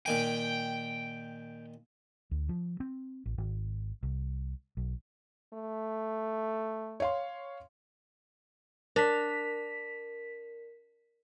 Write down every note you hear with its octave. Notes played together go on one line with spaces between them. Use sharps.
A#2 D#3 G5 G#5
D2
F3
C4
A1
G#1
C2
B1
A3
C#5 F5 C6
D4 A#4 B6